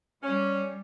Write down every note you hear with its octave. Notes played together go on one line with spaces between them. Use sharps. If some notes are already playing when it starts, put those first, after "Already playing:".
G3 C#4